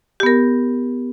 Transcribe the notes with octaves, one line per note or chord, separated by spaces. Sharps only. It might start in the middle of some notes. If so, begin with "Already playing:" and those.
B3 G4 A#4